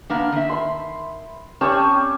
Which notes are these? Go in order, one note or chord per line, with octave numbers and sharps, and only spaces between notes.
A#3 B3 D4
D#3 E5
B5 C6
C4 C#4 G4 D5 A5 C#6